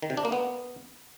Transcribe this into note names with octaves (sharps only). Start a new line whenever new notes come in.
D#3
C3
D4
A#3
B3